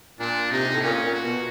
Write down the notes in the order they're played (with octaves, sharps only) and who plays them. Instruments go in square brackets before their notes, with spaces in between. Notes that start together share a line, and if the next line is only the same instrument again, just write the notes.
[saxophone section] A#2 [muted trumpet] D4
[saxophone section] C3 [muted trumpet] D#4
[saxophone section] A2
[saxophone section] A#2 [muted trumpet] C#4
[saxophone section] A#2
[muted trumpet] F#4
[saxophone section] B2